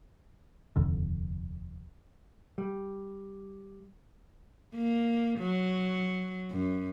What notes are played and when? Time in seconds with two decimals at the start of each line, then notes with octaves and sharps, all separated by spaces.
0.76 D#1 C2 F2 D3
2.58 G3
4.74 A#3
5.39 F#3
6.51 F#2